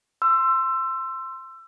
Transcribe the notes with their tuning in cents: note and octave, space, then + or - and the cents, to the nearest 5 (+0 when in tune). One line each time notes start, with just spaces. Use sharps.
C6 +0 E6 +20